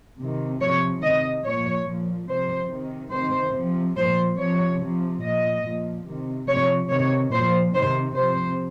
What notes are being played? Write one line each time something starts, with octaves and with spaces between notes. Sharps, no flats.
C3 D#3
C3 F3 C#5
C3 D#3 D#5
A#2 F3 C#5
A#2 F3
C3 F3 C5
C3 D#3
C3 D#3 C5
C3 F3
A#2 F3 C5
C3 F3 C#5
C3 F3
A#2 F3 D#5
A#2 F3
C3 D#3
C3 F3 C#5
C3 D#3 C#5
A#2 F3 C5
C3 D#3 C5
C3 F3 C5